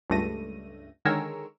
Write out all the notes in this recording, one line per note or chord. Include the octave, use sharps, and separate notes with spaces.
C#2 G2 A3 A#6 D#7
D3 D#3 G#3 A#4 C#5 E6